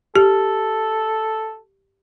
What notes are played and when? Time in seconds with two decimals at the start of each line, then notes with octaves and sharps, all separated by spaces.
0.16 G4 A4